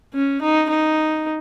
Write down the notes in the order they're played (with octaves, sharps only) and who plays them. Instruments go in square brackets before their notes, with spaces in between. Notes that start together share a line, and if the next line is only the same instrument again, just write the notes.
[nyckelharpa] C#4
D#4
D#4